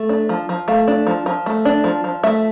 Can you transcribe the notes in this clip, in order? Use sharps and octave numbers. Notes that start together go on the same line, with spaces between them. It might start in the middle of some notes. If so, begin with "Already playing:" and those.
Already playing: A3
D4
F3
F3
A3 F5
D4
F3
F3
A3
D4
F3
F3
A3 E5